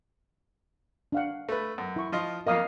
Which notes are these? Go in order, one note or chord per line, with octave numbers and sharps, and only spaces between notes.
D4 F5 F#5
A3 B4
F#2
E4 C#6
F3 F4 D#5
F2 A#3 A#4 D#5 F5 D#6